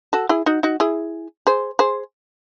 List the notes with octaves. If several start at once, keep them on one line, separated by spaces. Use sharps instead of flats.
F#4 A4
E4 G#4
D#4 F#4
D#4 F#4
E4 G#4
G#4 C5
G#4 C5